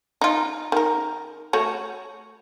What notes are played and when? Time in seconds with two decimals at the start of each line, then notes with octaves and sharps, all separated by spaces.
0.21 D#4 F4
0.72 D#3 A#4
1.53 A3 F#4 C#5